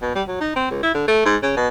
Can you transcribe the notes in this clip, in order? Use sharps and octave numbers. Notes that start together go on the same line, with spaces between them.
B2
G3
F#3
D#4
C4
C#2
E4
D3
A3
G#2
C#3
B2